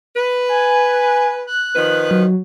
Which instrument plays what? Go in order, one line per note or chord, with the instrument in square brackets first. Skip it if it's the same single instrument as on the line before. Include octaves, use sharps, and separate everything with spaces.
[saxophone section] B4
[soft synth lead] G#5
F#6
[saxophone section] D#3 F3 B4
[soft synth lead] F#3